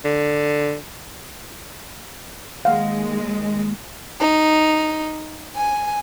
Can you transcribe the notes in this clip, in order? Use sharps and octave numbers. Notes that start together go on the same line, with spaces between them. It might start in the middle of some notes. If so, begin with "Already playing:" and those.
D3
D#2 G#3 F5 F#5
D#4
G#5